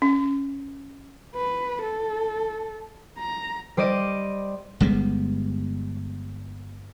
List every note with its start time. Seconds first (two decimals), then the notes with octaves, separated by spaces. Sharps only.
0.02 C#4
1.35 B4
1.82 A4
3.18 A#5
3.77 G3 C5 D5 D#5 D#7
4.80 G1 G3 G#3 B3